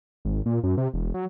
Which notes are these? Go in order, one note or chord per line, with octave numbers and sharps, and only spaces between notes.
G#1
A#2
F#2
C3
E1
F#3